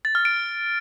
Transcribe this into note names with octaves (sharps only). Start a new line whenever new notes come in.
A6
F6
D7